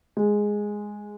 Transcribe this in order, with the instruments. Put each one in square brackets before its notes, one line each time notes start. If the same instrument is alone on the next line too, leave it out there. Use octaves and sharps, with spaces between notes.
[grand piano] G#3